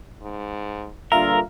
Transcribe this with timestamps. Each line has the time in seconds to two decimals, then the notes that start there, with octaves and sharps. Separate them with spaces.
0.22 G#2
1.12 G2 A#2 D3 F4 A#4 E5 F5 A#5